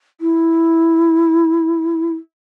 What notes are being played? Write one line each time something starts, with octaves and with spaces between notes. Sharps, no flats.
E4